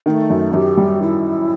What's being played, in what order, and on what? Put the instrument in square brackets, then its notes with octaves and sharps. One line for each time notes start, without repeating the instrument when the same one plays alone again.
[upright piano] D#3 [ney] B3
[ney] A3
[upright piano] F#2
[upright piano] F#2 [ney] G4
[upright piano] G3
[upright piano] D#3 [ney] E4